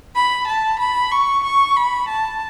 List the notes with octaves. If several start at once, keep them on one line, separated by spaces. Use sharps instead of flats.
B5
A5
B5
C#6
C#6
B5
A5